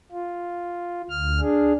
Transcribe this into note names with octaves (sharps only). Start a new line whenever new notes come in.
F4
D2 F6
D4 G#4